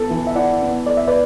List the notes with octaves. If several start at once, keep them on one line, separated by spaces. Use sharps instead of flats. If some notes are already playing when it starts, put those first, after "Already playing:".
Already playing: B3 E4 A4
E3
E5
E4 D5 F#5
B3
A4 D5
E5
B4 D5